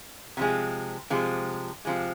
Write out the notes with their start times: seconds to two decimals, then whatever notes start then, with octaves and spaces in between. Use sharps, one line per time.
0.37 C3 F3 G#3
1.10 C3 F3 G#3
1.85 C3 F3 G#3